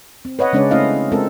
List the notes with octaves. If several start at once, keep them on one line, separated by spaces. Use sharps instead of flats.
C4
B4 C#5 D#5 F#5
C#3 G#3 C#4 D4 C#5 D5
A3 C4 C#4 E4 D#5 F5
G#3 C4 F4 A4 A#4